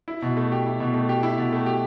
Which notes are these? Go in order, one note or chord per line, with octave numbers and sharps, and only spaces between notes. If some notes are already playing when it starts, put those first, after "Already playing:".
E4
B2
A3
G4
E4
B2
A3
G4
E4
B2
A3
G4